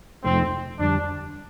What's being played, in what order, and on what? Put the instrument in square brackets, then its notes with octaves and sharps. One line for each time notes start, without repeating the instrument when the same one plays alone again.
[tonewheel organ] F2 C3 F3 A3 D#4 [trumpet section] C4
[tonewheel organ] F2 D3 G3 [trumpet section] D4